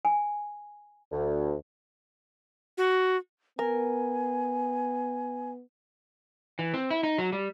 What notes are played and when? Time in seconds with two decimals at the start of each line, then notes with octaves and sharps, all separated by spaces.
0.05 G#5
1.11 D2
2.77 F#4
3.59 B3 A#4 G#5
6.59 E3
6.74 C4
6.90 E4
7.03 D#4
7.18 F#3
7.33 G3